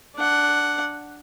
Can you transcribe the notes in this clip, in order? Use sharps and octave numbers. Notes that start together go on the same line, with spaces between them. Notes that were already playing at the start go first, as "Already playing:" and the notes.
D4 F#5